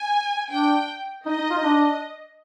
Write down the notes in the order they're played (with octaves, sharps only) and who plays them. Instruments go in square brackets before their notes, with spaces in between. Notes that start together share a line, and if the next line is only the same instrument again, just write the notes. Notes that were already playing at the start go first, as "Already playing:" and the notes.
Already playing: [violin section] G#5
[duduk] D4 [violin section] G5
[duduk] D#4 [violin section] D#5
[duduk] D#4
F4
D#4
D4